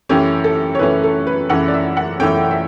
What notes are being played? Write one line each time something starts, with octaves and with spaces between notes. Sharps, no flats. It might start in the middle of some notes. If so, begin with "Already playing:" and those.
F#2 E3 A3 C#4 G4
A4
C#5
F#2 E3 A3 C#4 B4
A4
B4
F#2 E3 A3 C#4 F#5
D5
E5
F#5
F#2 E3 A3 C#4 G5
E5